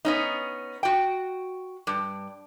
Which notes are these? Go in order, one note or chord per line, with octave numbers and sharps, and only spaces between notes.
B3 C#4 D#4
F#4 G5
G2